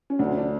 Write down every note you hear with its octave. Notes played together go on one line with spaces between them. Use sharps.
C#4
D2 D4
D4